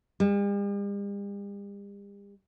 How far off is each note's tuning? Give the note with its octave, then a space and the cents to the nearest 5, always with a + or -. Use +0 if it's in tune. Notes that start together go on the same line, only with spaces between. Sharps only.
G3 +45